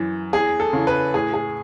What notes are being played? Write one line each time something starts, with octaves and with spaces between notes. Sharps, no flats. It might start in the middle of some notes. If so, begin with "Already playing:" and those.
Already playing: F#2 E3
E2 G#4
A4
C#3 E3
B4
A2 G#4
G#4